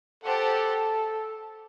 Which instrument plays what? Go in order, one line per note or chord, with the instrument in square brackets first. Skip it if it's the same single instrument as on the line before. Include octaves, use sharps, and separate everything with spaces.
[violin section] G4 C5 F#5 A5 [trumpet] A4